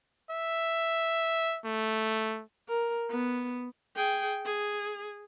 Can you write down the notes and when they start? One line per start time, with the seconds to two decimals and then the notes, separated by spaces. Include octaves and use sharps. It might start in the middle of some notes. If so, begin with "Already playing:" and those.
0.30 E5
1.65 A3
2.69 A#4
3.11 B3
3.96 G#4 G5
4.45 G#4